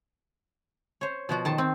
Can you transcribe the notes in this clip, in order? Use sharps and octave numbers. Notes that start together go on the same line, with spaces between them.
C5 C#5
B2 F3 F#4
D#3 A5 C6
C4